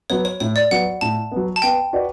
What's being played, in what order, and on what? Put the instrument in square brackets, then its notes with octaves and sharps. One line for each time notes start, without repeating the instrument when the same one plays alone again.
[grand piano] F#3 B3 [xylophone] C#5
[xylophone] C#5
[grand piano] A2 [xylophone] C#5
[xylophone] D5
[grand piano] F#3 B3 [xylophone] F#5
[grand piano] A2 [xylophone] A5
[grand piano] F#3 B3
[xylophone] A5
[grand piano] B3 [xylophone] G5
[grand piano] F#4 B4 D5